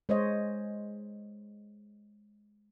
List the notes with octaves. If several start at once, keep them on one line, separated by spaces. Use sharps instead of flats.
G#3 C5 C#5 D#5